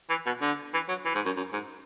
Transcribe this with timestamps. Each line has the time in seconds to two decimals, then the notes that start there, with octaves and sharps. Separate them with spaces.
0.10 E3
0.26 B2
0.42 D3
0.74 E3
0.88 F#3
1.05 E3
1.15 G#2
1.25 F#2
1.37 F#2
1.53 G#2